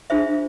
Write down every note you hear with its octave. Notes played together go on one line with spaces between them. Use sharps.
D4 F4 G#4 C5 E5